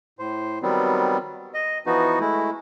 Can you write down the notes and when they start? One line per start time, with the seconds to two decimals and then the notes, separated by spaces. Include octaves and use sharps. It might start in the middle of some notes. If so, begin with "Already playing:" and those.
0.19 A2 C5
0.62 D#3 F#3 G3 B3 C4
1.54 D#5
1.86 E3 F3 B3 D#4 F#4
2.20 G#3 A3 E4